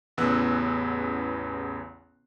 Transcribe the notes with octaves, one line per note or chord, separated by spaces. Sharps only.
A1 E2 C#3 B3 E6 F#6